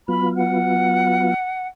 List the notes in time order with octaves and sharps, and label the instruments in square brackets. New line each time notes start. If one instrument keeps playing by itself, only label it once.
[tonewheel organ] F#3 B3 F4 [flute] B5
[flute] F#5